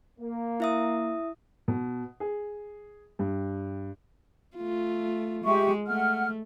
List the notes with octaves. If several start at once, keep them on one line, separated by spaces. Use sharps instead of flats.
A#3
E4 E5 D#6
B2
G#4
G2
A3 F4
G#3 G4 E5 C#6
A3 F#5 F6